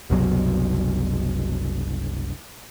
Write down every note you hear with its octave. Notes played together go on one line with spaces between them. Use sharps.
F#1 C2 B2 F#3